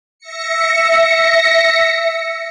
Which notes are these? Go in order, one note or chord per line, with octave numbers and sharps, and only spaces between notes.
E5 A#6 C#7